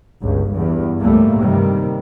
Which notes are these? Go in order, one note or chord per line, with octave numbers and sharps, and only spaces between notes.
G1 C#2
E2 G2
C#2 A2 G3 A3 A#3
G2 C3 D#3 G3